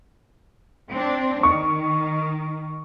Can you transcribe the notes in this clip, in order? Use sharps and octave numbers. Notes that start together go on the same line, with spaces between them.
C4 D4
D#3 C#6